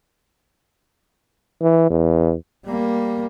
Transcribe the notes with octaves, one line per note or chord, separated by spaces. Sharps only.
E3
E2
G3 A#3